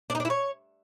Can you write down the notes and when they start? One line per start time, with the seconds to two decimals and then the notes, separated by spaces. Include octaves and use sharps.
0.10 D4
0.15 D#4
0.20 D4
0.25 E4
0.30 C#5